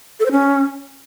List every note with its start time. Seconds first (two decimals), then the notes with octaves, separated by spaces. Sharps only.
0.20 A4
0.26 C5
0.31 C#4